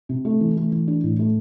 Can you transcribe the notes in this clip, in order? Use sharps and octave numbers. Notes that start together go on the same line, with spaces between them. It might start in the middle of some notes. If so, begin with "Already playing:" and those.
C3
A3
E3
A3
E3
D4
A2
A3